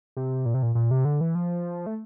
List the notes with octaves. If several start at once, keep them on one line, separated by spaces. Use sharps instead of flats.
C3
A#2
C3
A#2
A#2
C3
D3
E3
F3
A3